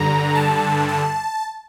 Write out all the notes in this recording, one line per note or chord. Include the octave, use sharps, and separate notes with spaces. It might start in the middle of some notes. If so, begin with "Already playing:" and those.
Already playing: G2 D3 A#5
A5
A5